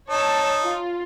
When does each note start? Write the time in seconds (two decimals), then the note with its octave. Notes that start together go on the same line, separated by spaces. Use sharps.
0.10 D#4 C#5 A5 E6
0.63 F4